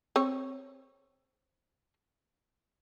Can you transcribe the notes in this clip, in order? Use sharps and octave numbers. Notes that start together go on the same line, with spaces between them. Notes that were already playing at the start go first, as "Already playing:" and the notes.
C4 C#5